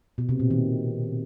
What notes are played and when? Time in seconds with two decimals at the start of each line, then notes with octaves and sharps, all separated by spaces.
0.18 B2
0.29 C3
0.40 A#2
0.50 D#3